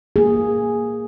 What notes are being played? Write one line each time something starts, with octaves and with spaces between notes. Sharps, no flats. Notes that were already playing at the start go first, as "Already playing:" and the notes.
A#3 G#4